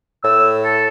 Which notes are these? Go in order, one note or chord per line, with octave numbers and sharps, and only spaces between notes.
A2 E6
A4